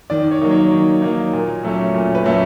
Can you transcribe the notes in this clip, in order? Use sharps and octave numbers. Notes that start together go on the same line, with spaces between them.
D#3 D5
C#5
F#3 A#3 D#4
C#5
D#3
F#3 A#3 D#4
A#2
F#3 A3 C#4
A#2
B4
F#3 A3 C#4